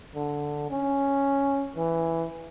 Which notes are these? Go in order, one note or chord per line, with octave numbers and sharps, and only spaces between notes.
D3
C#4
E3